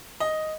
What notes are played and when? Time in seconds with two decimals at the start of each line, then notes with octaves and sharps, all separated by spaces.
0.20 D#5